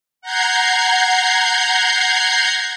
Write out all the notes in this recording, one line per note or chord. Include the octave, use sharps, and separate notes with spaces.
F#5 A#5 G6 G#6 C7